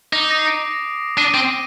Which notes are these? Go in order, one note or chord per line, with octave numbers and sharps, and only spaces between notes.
D#4 D6
D#6
A#6
C7
A#6 D7
D4 C7 D#7
C4